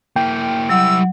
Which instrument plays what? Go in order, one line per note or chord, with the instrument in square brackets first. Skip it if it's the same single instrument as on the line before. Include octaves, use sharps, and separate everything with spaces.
[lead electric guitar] A#3 E4 [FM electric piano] G5
[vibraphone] F#3 F#5 [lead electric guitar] G3 E4 [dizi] E6